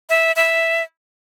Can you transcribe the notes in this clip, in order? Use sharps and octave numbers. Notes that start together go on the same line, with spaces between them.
E5
E5